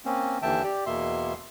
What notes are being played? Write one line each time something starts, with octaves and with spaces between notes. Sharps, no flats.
A#3 C4 C#4
D#2 D3 E3 E5 G5 A5
G4 D5
E2 B2 A#3 E5 C6